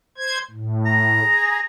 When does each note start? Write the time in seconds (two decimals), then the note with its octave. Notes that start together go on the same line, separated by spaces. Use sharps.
0.18 C5 G#6
0.51 A2
0.86 A#5
1.20 G#4